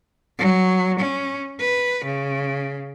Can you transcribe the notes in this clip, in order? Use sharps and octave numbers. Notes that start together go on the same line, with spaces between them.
F#3
C#4
B4
C#3